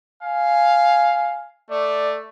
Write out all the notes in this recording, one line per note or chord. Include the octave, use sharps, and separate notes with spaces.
F5 G#5
A3 D5